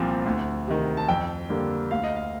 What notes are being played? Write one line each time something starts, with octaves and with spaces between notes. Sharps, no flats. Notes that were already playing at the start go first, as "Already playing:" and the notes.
Already playing: C2 A#2 F3 C4
D2
C3 D#3
A5
F2 G5
D3 G3 A#3
D2 F5
D#5
F5